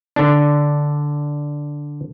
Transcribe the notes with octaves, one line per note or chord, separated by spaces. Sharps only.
D3 D4